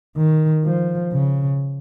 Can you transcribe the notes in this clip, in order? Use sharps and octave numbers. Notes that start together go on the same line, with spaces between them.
D#3
F3
C#3